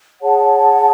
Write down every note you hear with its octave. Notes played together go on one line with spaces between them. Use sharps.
G#4 C#5 F#5 A5